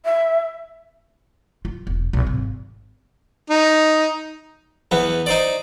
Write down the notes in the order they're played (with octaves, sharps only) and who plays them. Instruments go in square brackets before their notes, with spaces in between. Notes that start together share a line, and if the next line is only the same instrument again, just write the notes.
[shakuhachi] E5
[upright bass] F4
E1
B1
G#1
[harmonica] D#4
[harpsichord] E2 B3
D#4 C5 D5